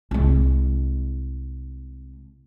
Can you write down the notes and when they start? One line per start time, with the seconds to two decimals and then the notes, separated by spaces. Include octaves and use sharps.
0.11 C2 G#3